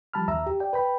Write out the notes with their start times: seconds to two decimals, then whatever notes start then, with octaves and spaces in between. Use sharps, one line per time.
0.14 F3 G3 A5 B5 F6
0.28 D#2 E5 A#5 E6
0.47 G4
0.60 D5 G5
0.73 B4 G5 B5